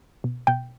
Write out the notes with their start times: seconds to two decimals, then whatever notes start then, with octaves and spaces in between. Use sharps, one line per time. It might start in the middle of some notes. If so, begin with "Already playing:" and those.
0.24 B2
0.47 B2 G5